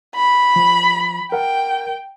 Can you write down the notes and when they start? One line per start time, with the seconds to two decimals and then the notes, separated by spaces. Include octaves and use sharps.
0.15 B5
0.56 F3
1.32 A#4 F#5 G5